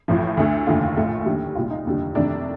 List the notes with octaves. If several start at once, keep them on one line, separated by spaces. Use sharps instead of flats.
A1 A2 F3
D2 D3 A3
F1 D#2 D3 A3 F4
A#1 A2 A3
D#2 D3 G3
C2 A#2 G3 F4
D#4
F1 D#2 D3 G3
F2 C3 D#3 A3 D4